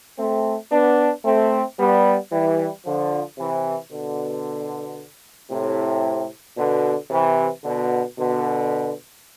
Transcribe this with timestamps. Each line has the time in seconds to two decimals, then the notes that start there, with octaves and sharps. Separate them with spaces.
0.17 A3 C4
0.71 B3 D4
1.25 A3 C4
1.78 G3 B3
2.31 E3 G3
2.84 D3 F3
3.38 C3 E3
3.90 B2 D3
5.51 A2 C3
6.57 B2 D3
7.10 C3 E3
7.64 B2 D3
8.18 B2 D3